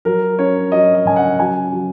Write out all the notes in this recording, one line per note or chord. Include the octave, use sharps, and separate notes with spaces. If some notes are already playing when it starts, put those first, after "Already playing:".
F#3 A#4
C#4 C#5
F#3 D#5
D#5
C#3 G#5
F#5
F#3 G#5
F#3